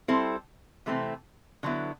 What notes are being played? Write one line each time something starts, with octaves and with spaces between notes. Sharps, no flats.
G3 C4 E4 A4 C5
C3 E3 A3 C4
D3 F#3 B3 E4